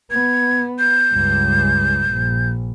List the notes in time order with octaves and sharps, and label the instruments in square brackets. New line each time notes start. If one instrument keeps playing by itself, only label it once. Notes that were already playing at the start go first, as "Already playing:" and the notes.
[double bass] B3 [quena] G#6
[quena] G6
[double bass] C#2 G2
A#1